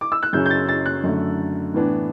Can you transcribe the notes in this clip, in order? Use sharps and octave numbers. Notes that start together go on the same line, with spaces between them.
D6
E6
F#6
F#2 C#3 F#3 C#4 G6
G6
A6
A6
F#6
F#2 D3 A3
A2 E3 B3 D4